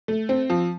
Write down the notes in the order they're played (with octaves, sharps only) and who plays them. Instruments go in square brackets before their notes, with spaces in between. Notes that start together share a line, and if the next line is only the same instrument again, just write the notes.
[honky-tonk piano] A3
C4
F3